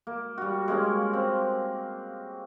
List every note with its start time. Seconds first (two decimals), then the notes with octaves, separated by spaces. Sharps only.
0.07 A#3
0.38 G3 F#4
0.68 G#3 A#3 C#4
1.13 C4